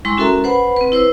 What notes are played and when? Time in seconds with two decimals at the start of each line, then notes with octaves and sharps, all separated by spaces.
0.05 G3 G#3 E4 C6 C#6
0.17 C#4 F#4 A4 A#4 E5 A#5
0.44 B4 C5 F#5 B5
0.77 C4 B4
0.92 E4 B4 C5 E6